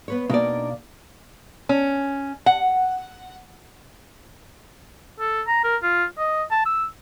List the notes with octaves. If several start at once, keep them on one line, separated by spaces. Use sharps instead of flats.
B3 B4 C#5
B2 A#3 D4 D#4 D5
C#4
F#5
A4
A#5
A#4
F4
D#5
A5
E6